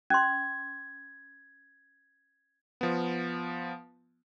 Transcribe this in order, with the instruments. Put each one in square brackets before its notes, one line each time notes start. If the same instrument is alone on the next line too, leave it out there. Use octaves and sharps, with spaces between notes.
[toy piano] C#4 C6 [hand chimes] G#6
[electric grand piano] F3 B3